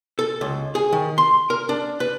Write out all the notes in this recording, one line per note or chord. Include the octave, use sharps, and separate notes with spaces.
A4
C#2
G#4
D#3
C6
A#4
D4
B4